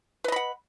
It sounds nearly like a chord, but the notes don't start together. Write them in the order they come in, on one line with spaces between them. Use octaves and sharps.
B4 D#5 B5 F#5